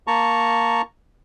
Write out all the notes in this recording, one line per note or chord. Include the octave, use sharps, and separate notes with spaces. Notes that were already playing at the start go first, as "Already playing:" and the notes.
A#3 A5 A#5 C#6